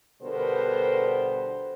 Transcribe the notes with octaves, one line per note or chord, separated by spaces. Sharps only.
B2 D3 G3 B3 A#4 C5